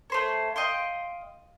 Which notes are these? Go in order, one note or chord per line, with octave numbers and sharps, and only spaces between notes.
A3 C5 C#5
D#5 F5 G5 C6